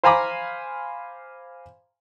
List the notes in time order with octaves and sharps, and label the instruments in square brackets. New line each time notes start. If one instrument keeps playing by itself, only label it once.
[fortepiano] C5 F5 G#5 A#5 B5 D6